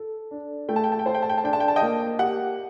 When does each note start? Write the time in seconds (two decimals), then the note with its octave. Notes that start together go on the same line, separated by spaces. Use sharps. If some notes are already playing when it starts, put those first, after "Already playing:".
Already playing: A4
0.31 D4
0.69 A3 G5
0.76 A5
0.84 G5
0.92 A5
0.99 G5
1.06 C5 A5
1.14 G5
1.22 A5
1.29 G5
1.38 A5
1.44 D4 G5
1.53 A5
1.60 G5
1.68 A5
1.76 D#5 G5
1.81 A#3
2.19 G4 F#5